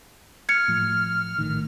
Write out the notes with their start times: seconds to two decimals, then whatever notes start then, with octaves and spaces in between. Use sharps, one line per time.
0.49 F6 G#6 C#7
0.68 A2 F3
1.38 A#1 A2 D#3